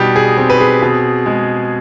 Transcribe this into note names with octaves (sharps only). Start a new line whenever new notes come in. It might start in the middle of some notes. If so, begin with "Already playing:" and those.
Already playing: B2 G3 D#4 G4
G#4
C4 G#4
B4
G#4
B2
G#3